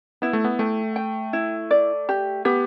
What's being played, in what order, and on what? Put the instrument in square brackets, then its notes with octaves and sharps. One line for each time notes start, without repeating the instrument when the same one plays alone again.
[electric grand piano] B3 [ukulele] E4
[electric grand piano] A3
B3
[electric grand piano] A3 [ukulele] G5
[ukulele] G5
E4
D5
G4
[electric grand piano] B3 [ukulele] G4